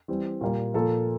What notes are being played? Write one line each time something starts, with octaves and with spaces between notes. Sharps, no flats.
E3 G3 C4
A#2 G3 A#3
A#2 F3 A#3 A4